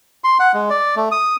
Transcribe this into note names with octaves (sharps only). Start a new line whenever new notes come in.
C6
F#5
G#3
D5
A3
D#6